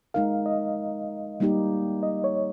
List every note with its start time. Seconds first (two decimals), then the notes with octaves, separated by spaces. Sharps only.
0.14 G#3 D#4 A#4 F5
0.46 D#5
1.40 G3 A#3 D#4 G4
2.03 D#5
2.24 C#5